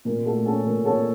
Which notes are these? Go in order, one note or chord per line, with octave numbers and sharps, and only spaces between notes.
A#2 A#4
A3 A4
C#4 A4
A#2 A#4
A#2 A4 C#5